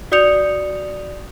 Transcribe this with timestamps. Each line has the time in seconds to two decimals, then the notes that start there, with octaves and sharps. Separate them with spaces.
0.12 F#4 D5 D#6 G6 C#7 F7